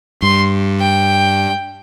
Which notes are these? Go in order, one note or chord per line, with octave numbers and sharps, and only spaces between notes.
G2 C6
G5